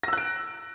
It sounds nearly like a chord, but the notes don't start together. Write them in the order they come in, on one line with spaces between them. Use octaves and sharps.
A#6 E6 F#6 D7